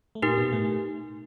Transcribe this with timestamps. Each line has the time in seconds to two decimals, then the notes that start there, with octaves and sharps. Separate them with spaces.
0.15 A3
0.22 A#2 A#3 D#4 G4 A#4
0.37 B2 B3
0.52 A2 A3